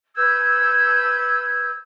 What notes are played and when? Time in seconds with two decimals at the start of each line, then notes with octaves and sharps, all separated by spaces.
0.16 B4 E6 G6 G#6